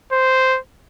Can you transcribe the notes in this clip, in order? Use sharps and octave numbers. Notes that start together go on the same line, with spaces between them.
C5